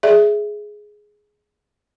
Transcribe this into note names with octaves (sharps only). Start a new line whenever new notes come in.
G#4 D5 E5